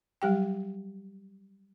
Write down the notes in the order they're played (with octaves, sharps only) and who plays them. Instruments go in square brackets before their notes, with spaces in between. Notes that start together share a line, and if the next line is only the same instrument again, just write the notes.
[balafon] F#3 G3 G4 G5